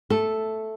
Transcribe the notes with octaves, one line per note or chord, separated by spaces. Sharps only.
A3 A4